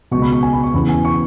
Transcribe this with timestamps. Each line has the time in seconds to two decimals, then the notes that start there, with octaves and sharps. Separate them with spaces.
0.11 C#2 B2 C#6
0.22 B5
0.33 C#6
0.43 G#5
0.53 B5
0.63 C#6
0.74 E2 C#3 E3 B5
0.89 G#5
1.05 C#6